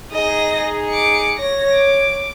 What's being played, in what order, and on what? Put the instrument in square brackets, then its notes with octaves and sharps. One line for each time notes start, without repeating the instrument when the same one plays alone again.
[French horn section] D#4 G#4 [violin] D#5 A#6
[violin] D6 C#7
[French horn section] C#5 [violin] A#6
[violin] D6